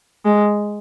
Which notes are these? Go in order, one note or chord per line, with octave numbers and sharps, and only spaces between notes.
G#3